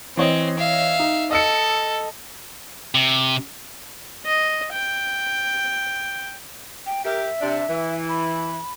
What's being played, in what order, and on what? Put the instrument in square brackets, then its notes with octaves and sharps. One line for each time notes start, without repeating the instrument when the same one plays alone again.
[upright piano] E3 C#5 D#5 [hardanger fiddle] C4
[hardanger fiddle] E5 F5
[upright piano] D#4
[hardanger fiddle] A4 [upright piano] D#5 E6 C#7
[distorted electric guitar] C3
[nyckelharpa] D#5
G5
[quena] G5
[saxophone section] G4 A#4 [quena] E5
[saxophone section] C3 D4
E3
[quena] B5